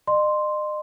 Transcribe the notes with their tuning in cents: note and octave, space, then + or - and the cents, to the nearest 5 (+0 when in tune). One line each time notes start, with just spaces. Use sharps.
D#5 -40 C6 +0